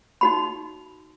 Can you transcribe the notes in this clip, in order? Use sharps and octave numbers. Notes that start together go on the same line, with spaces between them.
D#4 F#4 B5